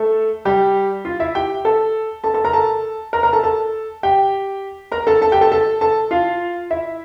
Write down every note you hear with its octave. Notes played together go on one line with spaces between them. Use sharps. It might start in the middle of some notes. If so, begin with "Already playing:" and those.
Already playing: A3 A4
G3 G4
F4
E4 E5
G4 G5
A4 A5
A4 A5
A4 A5
A#4 A#5
A4 A5
A#4 A#5
A#4 A#5
A4 A5
A4 A5
G4 G5
A#4 A#5
A4 A5
A4 A5
G4 G5
A4 A5
A4 A5
A4 A5
F4 F5
E4 E5